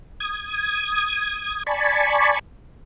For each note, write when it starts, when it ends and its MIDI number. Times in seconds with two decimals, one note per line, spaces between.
0.20 1.63 87
0.20 1.63 92
1.66 2.39 74
1.66 2.39 80
1.66 2.39 81
1.66 2.39 83
1.66 2.39 85